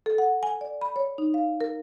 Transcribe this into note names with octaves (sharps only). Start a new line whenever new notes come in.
A4
F#5
G#5
D5
B5
C#5
D#4
F5
A#4